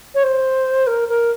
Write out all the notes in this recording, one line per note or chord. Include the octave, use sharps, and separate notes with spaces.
C#5
C5
A#4
A#4